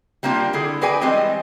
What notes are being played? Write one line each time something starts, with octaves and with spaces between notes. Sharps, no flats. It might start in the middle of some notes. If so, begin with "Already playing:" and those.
G3 A#3 C4 D4 F4
D3 E4 G#4
F#4 G#4 B4 D5 G5 G#5
E3 G3 G#3 C4 D#5